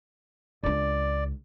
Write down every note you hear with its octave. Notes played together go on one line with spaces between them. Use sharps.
C#2 D4 D5